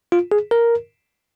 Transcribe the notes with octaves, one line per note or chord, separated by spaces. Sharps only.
F4
G#4
A#4